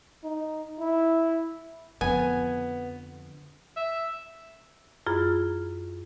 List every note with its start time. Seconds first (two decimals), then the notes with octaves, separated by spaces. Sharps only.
0.24 D#4
0.80 E4
2.01 F2 D3 B3 G#5
3.77 E5
5.06 F#2 E4 F4 G#4 B5 F6